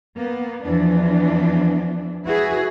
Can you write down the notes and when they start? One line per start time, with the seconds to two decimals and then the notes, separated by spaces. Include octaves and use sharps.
0.15 A#3 B3
0.62 E2 E3 F3 B3 D4
2.24 E4 F#4 G#4 B4